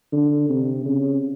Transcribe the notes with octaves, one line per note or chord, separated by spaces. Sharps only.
D3
C3
C#3